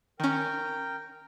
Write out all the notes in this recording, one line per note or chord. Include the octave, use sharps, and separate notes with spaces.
D#3 C#4 A#4 G5